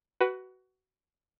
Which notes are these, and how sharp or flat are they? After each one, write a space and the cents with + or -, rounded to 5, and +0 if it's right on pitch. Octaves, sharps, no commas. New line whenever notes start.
F#4 +20 B4 +0